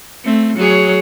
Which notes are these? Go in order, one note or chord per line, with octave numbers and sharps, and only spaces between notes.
A3 C4
F#3 G#4 C#5